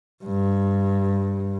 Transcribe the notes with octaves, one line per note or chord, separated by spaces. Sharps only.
G2